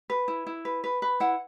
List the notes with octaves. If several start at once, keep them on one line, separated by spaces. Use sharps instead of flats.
B4
E4
E4
B4
B4
B4
E4 F#5